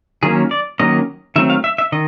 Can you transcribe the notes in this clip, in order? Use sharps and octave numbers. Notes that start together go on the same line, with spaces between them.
D#3 F#3 A#3 C#4 G#4
D5
D#3 F#3 A#3 C#4 D#5
D#3 F#3 A3 C4 E5
F5
E5
E5
D#3 D#5